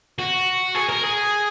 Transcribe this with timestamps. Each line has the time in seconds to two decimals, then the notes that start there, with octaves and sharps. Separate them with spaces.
0.19 F#4
0.75 G#4
0.89 A#4
1.03 G#4